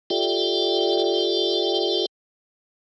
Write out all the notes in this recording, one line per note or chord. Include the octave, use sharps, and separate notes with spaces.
F4 G4 A4 D5 E5 G5